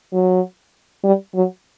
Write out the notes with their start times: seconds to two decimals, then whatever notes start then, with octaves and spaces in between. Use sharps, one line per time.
0.13 F#3
1.04 G3
1.35 F#3